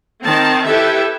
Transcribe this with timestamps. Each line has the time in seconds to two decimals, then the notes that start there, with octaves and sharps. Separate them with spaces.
0.22 D#3 C4 A5
0.64 E4 G4 A4 B4 E5